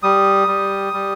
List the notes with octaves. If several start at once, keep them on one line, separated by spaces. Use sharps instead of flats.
G3 D#6
G3
G3